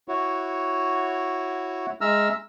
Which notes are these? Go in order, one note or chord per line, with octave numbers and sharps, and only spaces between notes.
E4 F#4 C#5
G#3 E5 A#5 E6 F6